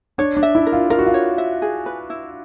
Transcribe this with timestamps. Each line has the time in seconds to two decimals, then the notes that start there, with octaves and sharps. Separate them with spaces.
0.18 D4 C#5
0.37 D4
0.43 E5
0.55 E4
0.66 A#4
0.73 F4
0.90 F4 A#4
0.99 F#4
1.06 F4
1.14 C#5
1.38 E5
1.62 G#4
1.86 B4
2.10 E4